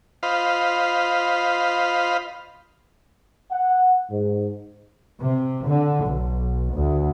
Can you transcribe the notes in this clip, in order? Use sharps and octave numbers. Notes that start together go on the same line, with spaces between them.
F4 C5 D#5 F5 B5
F#5
G#2
C3
D3
B1
D2